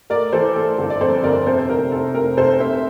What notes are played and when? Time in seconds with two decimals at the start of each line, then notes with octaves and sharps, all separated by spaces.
0.10 A3 A#4 D5
0.33 E3 A4 C5
0.55 A3 A4
0.78 G1 A4
0.90 D5
1.01 F2 A4 C5
1.24 G1 A#4 D5
1.46 C3 A4 C5
1.58 C5
1.69 F1 A#4
1.92 F1 A4
2.15 F1 A#4
2.37 F1 A4 C5
2.60 C3 C5 E5